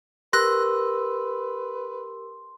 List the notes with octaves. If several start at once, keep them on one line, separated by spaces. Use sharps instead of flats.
G4 A#4 B4 C6 E6 F#6 A#6